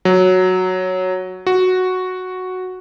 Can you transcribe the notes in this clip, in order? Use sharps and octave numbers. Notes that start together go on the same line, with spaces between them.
F#3
F#4